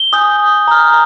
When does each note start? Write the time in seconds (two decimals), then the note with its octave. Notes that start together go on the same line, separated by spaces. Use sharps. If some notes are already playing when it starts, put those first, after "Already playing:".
Already playing: G7
0.13 G#5 D#6 G6
0.68 A#5 F6